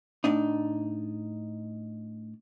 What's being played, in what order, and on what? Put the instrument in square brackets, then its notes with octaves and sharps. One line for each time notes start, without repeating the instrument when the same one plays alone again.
[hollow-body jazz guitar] A2 D4 D#4